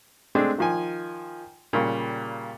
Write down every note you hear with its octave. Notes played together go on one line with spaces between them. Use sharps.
G#3 A3 C4 D4 G#4
D#3 F3 G#5
A#2 C#3 G3